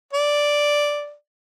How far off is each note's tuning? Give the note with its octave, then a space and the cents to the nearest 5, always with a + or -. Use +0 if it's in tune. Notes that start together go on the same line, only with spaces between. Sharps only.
D5 +0